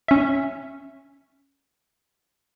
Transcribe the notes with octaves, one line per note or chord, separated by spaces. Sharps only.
C#4 E5